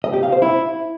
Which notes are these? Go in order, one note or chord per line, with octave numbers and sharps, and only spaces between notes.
D#5
G4
F5
C5
E4